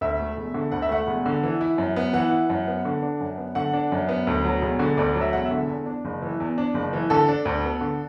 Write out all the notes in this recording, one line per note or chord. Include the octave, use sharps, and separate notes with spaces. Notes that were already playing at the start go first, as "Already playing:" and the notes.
D2 E5
A3
E1
D3
D2 F#5
E5
A3 F#5
E1
D3
E3
E4
F#2
B3
E3 F#5
E4
F#2
B3
D3
D4
F#2
B3
D3 F#5
D4
F#2
B3
D2
F#3
E1
D3
D2 D5
F#3
E5
E1 F#5
E5
D3
E2
D4
F#1
E3
E2
D4
F#1
E3
D3 A4
D4
D2
B3
D3